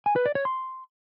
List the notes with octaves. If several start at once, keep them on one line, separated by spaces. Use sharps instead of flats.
G#5
B4
D5
C#5
C6